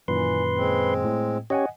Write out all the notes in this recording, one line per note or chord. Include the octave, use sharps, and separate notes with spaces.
F#2 A#2 D#3 E3 B4 C6
G#3 C4
A2
C#4 G4 C#5 D#5 F#5 G#5